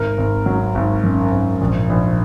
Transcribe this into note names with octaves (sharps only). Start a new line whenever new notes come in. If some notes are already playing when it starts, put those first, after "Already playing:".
Already playing: G#1 A#4
G#1
F#3
G#1
F#2
G#1
A#1
A#1